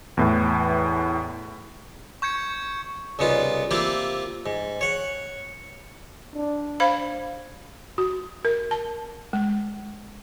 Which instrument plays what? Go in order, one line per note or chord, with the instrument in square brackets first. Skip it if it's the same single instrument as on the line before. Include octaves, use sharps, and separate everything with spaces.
[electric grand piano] E2 A2 E3
[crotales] C#6 G6 G#6 C#7
[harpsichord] C2 C#3 B3 D#4 F4
A#3 C4 E4 F4 G4
G#2
C#5 F#5
[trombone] D4
[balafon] C5 F5 B5
F#4
A#4
A5
G#3